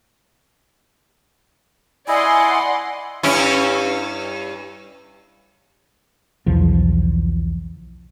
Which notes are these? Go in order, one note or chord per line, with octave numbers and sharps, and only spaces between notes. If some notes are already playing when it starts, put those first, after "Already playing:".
E4 D5 D#5 F#5 G#5 C6
G2 C#4 E4
B1 E2 C#3 F3